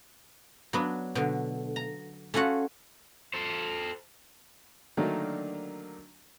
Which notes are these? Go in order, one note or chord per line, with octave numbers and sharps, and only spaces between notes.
F#3 B3 D4
B2 D3
A#5
A3 C#4 F4 F#4 F#5
A4 C5
D3 D#3 F#3 A3 A#3 D4